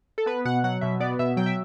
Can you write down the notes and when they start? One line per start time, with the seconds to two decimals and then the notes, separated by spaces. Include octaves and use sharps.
0.18 A4
0.26 B3 B4
0.45 B2 F#5
0.64 F#3 F#5
0.81 B2 E5
1.00 B3 D5
1.19 B2 E5
1.37 F#3 G5
1.46 E5